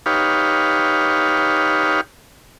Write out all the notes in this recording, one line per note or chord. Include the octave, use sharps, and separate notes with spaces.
D#4 G4 B4 C#5 F5